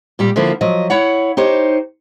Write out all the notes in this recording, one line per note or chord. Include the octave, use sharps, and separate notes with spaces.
A#2 G3 G4
D3 F3 A#3 E4
F3 F#3 D#5
E4 C#5 F#5
D#4 G4 C5 C#5